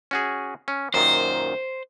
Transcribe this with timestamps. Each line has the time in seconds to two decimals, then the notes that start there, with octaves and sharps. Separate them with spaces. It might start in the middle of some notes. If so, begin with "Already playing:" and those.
0.11 C#4 F#4 G#4
0.68 C#4
0.94 F#2 A#2 D#3 C5